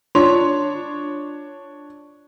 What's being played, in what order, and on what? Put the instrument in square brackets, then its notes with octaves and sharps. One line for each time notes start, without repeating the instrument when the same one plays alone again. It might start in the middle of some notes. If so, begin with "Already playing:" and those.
[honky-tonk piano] D4 C#5 [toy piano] F4 C6